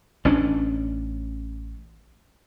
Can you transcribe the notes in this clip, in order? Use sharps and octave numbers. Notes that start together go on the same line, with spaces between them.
A1 C#4 D4